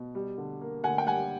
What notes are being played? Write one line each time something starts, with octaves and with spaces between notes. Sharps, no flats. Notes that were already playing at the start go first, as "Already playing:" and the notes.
Already playing: B2
G3
D3
A#3
D3 F#5 G#5
G5
G3 F#5 G#5